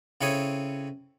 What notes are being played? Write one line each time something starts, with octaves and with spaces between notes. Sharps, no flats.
C#3 C4 E4 A4 C#5 D#6